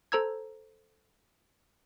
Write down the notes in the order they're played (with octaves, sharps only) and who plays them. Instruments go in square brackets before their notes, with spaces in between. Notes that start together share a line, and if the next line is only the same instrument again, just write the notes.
[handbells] A4 C5 A#5 E6 G#6